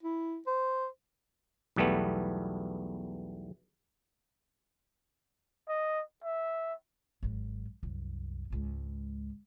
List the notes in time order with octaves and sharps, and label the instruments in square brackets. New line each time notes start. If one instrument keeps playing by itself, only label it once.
[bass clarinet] E4
C5
[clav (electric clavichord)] B1 E2 G3 A3 B3
[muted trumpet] D#5
E5
[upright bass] G#1 F#3
C2 F#2
G#1 C#2